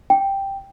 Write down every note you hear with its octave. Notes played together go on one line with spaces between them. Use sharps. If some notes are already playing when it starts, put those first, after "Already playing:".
G5